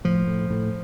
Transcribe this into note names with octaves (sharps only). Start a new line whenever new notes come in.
A2 F3
A2
A2